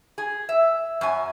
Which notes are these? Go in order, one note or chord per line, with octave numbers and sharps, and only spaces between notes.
G#4
E5
F#2 G#5